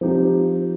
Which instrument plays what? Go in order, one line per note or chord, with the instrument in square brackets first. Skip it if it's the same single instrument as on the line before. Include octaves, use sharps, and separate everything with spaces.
[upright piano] F3 C4 D#4 G4